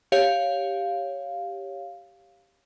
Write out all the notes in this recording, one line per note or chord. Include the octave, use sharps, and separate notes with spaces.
G4 C#5 F5